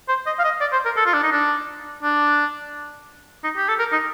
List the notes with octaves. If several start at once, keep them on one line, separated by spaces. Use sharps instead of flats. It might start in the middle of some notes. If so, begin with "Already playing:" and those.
C5
D#5
F5
D#5
D5
C5
A#4
A4
F4
D4
D#4
D4
D4
D#4
G4
A4
A#4
D#4